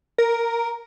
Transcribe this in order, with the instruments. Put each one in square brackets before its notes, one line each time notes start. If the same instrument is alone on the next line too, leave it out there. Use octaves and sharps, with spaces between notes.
[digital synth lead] A#4